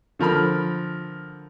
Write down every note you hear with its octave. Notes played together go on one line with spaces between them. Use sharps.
D3 F3 A#4 B5 F6